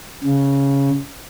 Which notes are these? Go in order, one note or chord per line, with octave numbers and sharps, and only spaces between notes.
C#3